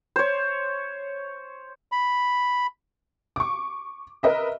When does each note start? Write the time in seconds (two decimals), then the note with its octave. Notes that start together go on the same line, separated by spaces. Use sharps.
0.16 C5 C#5
1.92 B5
3.36 C#6 D6
4.23 A#4 B4 D#5 E5